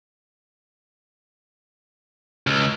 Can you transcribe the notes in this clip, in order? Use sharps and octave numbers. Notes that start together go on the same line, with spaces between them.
C#2